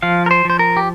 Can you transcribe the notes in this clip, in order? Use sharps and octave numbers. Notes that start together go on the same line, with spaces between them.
F3 F5
A#4
C5
F3 C5
A#4
G4